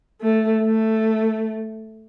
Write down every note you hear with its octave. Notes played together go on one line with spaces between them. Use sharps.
A3
A3